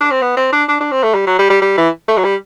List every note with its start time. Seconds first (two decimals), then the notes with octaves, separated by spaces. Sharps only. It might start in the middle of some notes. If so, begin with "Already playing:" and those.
0.01 D4
0.11 C4
0.22 B3
0.37 C4
0.52 D4
0.68 D4
0.81 D4
0.91 C4
1.03 A3
1.14 G3
1.27 F#3
1.39 G3
1.50 G3
1.62 G3
1.78 E3
2.08 A3
2.17 F#3
2.24 G3